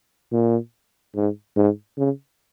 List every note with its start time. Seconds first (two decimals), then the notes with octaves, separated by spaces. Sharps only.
0.32 A#2
1.16 G#2
1.56 G#2
1.97 C#3